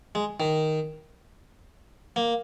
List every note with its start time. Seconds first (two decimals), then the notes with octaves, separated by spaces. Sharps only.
0.15 G#3
0.40 D#3
2.16 A#3